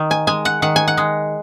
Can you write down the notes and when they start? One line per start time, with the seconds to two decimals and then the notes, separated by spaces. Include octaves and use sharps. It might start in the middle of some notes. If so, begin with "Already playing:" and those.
Already playing: D#3
0.11 G#5
0.27 G#3 G#5
0.45 F#5
0.62 D#3 F#5
0.76 G#5
0.88 F#5
0.97 G#3